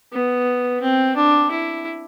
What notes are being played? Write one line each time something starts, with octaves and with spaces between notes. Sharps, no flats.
B3
C4
D4
E4